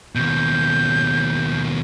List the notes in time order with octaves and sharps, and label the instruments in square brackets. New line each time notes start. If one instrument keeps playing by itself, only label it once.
[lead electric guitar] D#2 B2 [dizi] G6